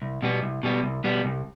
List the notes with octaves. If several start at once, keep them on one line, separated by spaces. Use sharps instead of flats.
C2
B2 G3 B3
C2
B2 G3 B3
C2
B2 G3 B3
C2